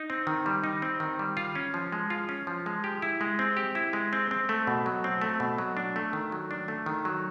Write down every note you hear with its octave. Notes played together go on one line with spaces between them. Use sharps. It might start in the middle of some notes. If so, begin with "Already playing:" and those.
Already playing: D#4
C4
D#3
G3
D#4
C4
D#3
G3
F4
C#4
F3
G#3
F4
C#4
F3
G#3
G4
E4
G#3
C4
G4
E4
G#3
C4
C4
A3
B2
F#3
C4
A3
B2
F#3
D4
A3
D#3
F#3
D4
A3
D#3
F#3